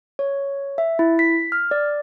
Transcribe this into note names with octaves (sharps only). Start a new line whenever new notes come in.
C#5
E5
E4
B6
F6
D5